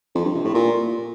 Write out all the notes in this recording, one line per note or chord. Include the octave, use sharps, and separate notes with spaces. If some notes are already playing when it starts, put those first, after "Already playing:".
F2
G2
C3
A2
A#2